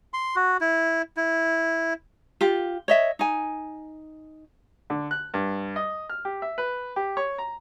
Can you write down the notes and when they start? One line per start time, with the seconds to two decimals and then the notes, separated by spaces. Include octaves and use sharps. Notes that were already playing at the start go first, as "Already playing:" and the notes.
0.14 C6
0.36 F#4
0.61 E4
1.17 E4
2.41 F4 G4
2.88 C#5 D#5 E5
3.19 D#4 G#5
4.90 D3
5.11 F#6
5.34 G2
5.76 D#5
6.10 F6
6.25 G4
6.42 E5
6.58 B4
6.96 G4
7.17 C#5
7.38 A#5